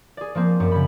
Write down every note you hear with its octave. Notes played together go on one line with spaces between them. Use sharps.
G#4 D5
F3 A#3 C4
F#2
C#3 B5